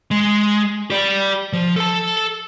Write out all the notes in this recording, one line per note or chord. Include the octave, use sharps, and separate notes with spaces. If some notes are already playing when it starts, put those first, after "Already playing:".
G#3
G4 D5
F3
A4 A5